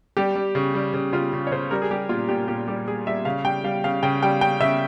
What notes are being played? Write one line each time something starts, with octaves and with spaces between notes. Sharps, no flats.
G3 G4
G3
C#3
G3
C#3
C#3 F4
C#3
C#5
C#3 C5
G3 A#4
G#4
G3 G4
A#2 F4
A#2 G4
A#2 G4
G3 G4
G3 G#4
G3 E5
C#3 F5
G3 G5
G3 F5
C#3 F5
C#3 G5
G3 G5
C#3 G5
C#3 E5